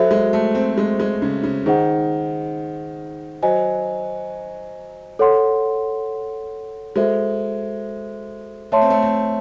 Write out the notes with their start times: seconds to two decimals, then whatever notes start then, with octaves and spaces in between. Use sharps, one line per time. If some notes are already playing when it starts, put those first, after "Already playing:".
Already playing: F#3 F#4 A4 C5 E5
0.11 G#3
0.33 A3
0.55 C4
0.78 G#3
1.00 G#3
1.22 C#3
1.44 C#3
1.66 D#3 D#4 G#4 C5 D#5 F#5
3.42 F#3 C5 D#5 G#5
5.19 A4 C#5 F#5 C6
6.96 G#3 F#4 A4 C5 E5
8.72 A3 C#5 E5 A5 C6
8.81 C4
8.90 A3
9.02 C4